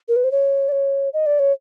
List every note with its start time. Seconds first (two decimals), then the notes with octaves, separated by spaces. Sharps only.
0.09 A#4
0.16 B4
0.24 C5
0.32 C#5
0.69 D5
0.72 C#5
1.13 D#5
1.26 D5
1.39 C#5